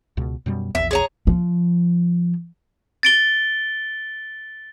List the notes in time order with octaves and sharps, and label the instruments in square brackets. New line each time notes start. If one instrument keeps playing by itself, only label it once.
[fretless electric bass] C#2 B2
F#2 B2 G3
[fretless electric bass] A#1 E2 [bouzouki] E5
[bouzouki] G#4 C#5 A#5
[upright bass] F3
[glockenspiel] A6 D7 G7